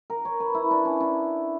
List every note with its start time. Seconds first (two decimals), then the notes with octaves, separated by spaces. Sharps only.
0.10 A#4
0.25 C#5
0.40 B4
0.54 E4
0.71 D4
0.85 C#4
1.00 D4